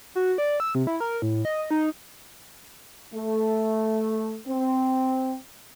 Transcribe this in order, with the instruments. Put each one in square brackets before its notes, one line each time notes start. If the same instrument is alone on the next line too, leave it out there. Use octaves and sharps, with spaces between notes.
[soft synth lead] F#4
D5
E6
C3
E4
A#4
A2
D#5
D#4
[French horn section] A3
C4